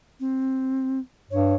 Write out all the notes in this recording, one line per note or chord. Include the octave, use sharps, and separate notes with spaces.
C4
G2 C#5